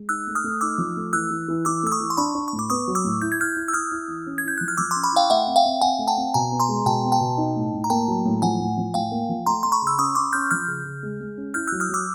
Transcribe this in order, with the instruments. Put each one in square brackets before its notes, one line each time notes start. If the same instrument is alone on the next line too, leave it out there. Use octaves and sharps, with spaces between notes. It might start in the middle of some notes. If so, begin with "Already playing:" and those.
Already playing: [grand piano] G#3
[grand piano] D#4 [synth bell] E6 F#6
[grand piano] A3
[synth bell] D#6 F6
[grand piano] A3
[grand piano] D#4 [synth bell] D6 E6
[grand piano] F3
A3
[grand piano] E3 [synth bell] E6 F#6
[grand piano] E3
E3
[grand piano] E3 [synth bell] D6 E6
[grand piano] A3 [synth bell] E6
[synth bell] C#6 D#6
[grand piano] E3
[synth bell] C6
[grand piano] D4 [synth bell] B5 C#6
[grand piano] D4
[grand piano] A2 [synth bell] C#6
[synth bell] D6
[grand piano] B3 [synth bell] C#6 D#6
[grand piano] F#3
[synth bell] D6 E6
[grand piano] A2
[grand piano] E4 [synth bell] G6
[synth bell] G#6
[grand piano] E4 [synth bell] F6 G6
[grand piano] E4
[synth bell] E6
[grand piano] E4 [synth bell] D#6 F6
[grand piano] E4
E3
C#4
[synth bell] G#6
[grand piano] E4 [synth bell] G6
[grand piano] F3 [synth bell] F#6
[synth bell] F6
[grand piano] F3 [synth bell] D6 E6
[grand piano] C#4 [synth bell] C6 D6
[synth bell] B5 C#6
[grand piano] E4 [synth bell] F5 G5
[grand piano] A3 [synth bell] E5 F#5
[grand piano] C4
[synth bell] F5 G5
[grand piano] C4
[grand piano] C4 [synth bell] F#5 G#5
[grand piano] A3
[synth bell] G5 A5
[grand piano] C4
[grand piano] B2 [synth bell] G#5 A#5
[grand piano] B3
[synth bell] A#5 C6
[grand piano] G#3
[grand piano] B2 [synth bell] G5 A5
[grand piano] B3
[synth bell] G5 A5
[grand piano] B2
D#4
A2
A2
[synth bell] A#5
[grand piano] A#3 [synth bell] G5 A5
[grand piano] F#3
A2
[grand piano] F3 [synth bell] F#5 G#5
[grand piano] A2
F3
[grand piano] A2 [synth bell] F5 G5
[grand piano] A#3
F3
[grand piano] A3 [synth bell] A#5 C6
[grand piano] A3 [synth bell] C6
[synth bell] B5 C#6
[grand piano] C#3
[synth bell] E6
[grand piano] C#4 [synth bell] C#6 D#6
[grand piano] C#4 [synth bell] C6 D6
[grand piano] C#4 [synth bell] F6 G6
[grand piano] F3 [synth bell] F6 G6
[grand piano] C#3
C#3
G#3
G#3
C#4
[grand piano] E4 [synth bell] F6 G6
[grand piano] F#3 [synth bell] E6 F#6
[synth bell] D#6 F6
[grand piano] F#3 [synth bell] D6 E6